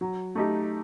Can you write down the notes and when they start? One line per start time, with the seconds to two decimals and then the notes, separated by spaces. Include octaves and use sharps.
0.01 F#3
0.35 A3 D#4 G4